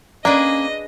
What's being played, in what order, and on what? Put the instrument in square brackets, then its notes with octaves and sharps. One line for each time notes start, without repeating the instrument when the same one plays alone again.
[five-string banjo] A#3 [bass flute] C#4 [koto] D4 G#4 B4 [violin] D#5